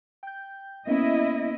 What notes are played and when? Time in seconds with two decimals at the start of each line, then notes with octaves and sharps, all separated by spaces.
0.23 G5 G6
0.87 A#3 B3 C#4 E4 D#5